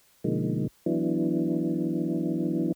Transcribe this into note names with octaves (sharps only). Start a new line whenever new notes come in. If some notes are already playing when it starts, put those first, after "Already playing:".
B2 D3 F3 G#3 A#3 D#4
E3 F#3 B3 D4 E4